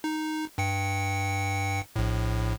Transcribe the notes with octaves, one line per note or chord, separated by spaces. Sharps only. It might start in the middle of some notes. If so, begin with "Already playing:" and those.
D#4
G2 G5 C#7
A#1 A2